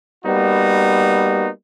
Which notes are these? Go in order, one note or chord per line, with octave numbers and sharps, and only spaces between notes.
G3 A#3 B3 D#4 F#4